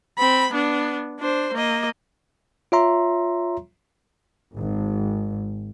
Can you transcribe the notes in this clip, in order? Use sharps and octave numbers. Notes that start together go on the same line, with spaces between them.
C4 B5
B3 D4
D4 C5
A#3 D#5
F4 C#5 E5 A#5 C6
G#1